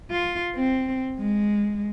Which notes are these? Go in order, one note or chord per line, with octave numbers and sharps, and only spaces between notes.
F4
C4
G#3